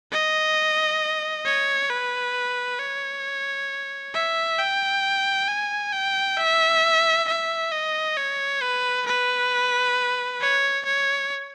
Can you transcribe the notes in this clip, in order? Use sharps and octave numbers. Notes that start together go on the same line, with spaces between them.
D#5
C#5
B4
C#5
E5
G5
G#5
G5
E5
E5
D#5
C#5
B4
B4
C#5
C#5